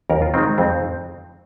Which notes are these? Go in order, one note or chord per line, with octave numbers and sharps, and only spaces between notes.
D#2 A#4
F4
D#3 G#3 C4
F2 C4